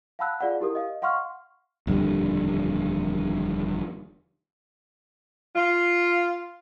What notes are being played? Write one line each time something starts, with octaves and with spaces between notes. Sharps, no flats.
F5 F#5 A5 B5 E6 F#6
F4 G#4 D5 F5 F#5
E4 G4 A#4 D#6
D#5 F5
F5 F#5 C6 C#6 F6
D#1 F2 D3 G3
F4